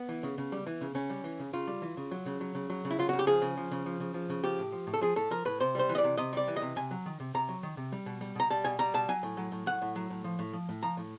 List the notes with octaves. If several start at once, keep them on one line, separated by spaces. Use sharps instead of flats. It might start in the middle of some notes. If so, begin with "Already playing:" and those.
Already playing: B3
E3
C#3
C#3
G3
E3
C#3
C#3 C#4
G3
E3
C#3
C#3 F4
G3
E3
C#3
F#3
C#3
F#3
C#3
F#3
C#3
E4
F#3 F4
C#3 F#4
G4
F3 G#4
C#3
F3
C#3
F3
C#3
F3
C#3
F3 G4
A2
F3
A2
A4
F3 G#4
A2 A4
F3 A#4
A2 B4
C3 C5
G3 C5
E3
D#5
D5
C3
C3 D#5
G3 D5
E3
D#5
C3
C3 G#5
F#3
D#3
C3
C3 A#5
F#3
D#3
C3
G3
B2
G3
B2 A#5
G3 A5
B2 G#5
G3 A#5
B2 A5
F#3 G#5
A2
F#3
A2
F#3 F#5
A2
F#3
A2
F3
A2
F3
A2
F3 A#5
A2